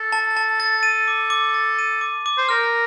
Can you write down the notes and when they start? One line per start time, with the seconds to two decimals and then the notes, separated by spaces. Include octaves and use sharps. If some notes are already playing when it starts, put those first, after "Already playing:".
Already playing: A4
0.12 A5
0.37 A5
0.60 A6
0.83 D#7
1.08 D6
1.30 D6
1.54 A6
1.79 D#7
2.01 D6
2.26 D6
2.38 C5
2.49 A#4 F6